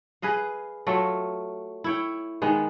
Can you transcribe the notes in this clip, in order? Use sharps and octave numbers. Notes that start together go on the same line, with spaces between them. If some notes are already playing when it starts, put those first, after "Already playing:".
G#4 B4 D#5 F5
F#3 A3 F4
E4 C#5 G5
D#3 G#3 B3